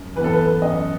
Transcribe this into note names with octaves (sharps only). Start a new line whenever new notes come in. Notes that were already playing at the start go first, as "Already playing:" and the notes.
Already playing: F#2
E3 B3 A4 B4
B4
F#2 D#5